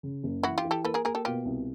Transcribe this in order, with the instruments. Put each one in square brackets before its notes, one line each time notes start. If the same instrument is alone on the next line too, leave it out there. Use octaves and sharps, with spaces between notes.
[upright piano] C#3
F#1
[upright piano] E3 [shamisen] E4 F#4
[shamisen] F4 G4
[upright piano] E3
[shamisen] G4 A4
[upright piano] A#3 [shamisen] A4 B4
[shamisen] G#4 A#4
[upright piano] A#3 [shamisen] G#4 A#4
[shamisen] G4 A4
[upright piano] B2 [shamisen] F4 G4
[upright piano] C2